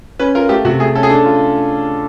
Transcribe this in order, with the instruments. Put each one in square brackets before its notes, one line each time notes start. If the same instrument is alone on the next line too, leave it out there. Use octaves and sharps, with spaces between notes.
[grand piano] C#4 B4
F4 A#4
A3 G4
C3 F#4
A3 G#4
C#4 A4
G#4
D4 A4
F4